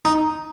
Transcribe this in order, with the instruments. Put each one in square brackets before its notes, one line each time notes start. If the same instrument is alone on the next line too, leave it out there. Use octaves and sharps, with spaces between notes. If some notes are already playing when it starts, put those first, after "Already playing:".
[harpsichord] D#4